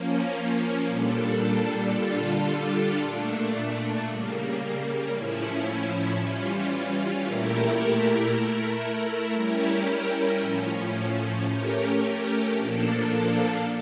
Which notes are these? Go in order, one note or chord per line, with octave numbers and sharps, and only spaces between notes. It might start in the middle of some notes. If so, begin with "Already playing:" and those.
Already playing: F3 A#3 C#4
A#2 G3 D4 A4
D3 G3 D4 F4 A4
A#2 A3 D4
C#3 G3 A#3
A2 F3 C#4 E4
E3 G3 C#4 F4
A#2 A3 E4 G4 A#4
A3 E4 A#4
G3 C#4 E4 G4 A#4
A2 F3 C#4
A3 C#4 G4 A#4
A#2 F3 A#3 D4 A4